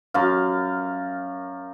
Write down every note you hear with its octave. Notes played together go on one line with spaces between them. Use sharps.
F#2 F5